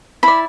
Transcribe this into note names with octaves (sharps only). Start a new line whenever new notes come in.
E4 D5 B5